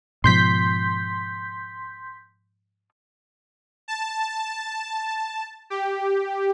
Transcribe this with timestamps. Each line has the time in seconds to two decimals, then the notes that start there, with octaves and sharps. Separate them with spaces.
0.24 G#2 B2 F3 C6 G6 B6
3.88 A5
5.70 G4